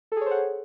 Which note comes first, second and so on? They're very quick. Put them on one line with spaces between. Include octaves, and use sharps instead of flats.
A4 G#4 C#5 C5 F#5